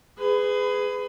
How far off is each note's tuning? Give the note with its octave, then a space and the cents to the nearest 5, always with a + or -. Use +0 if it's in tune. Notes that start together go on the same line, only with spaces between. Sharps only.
G#4 +0 B4 +25